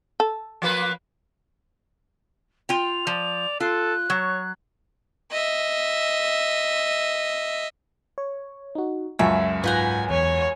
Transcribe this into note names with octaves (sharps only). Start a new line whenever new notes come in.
A4
F3 A#3 B4
F4 G5 F7
F3 D5
F4 A4 F#6
F#3 C#5
D#5 E5
C#5
D#4 F#4
C#2 F#2 E5 G#5 A5 C#6
G#2 F4 B4 F#5 G#5 A#5 G6
E2 C#5 G#5